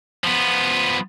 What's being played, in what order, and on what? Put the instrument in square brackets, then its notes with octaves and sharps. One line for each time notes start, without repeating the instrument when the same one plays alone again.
[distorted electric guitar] F3 B3